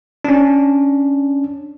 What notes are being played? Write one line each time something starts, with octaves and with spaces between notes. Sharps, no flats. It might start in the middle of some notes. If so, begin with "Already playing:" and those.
C#4 D4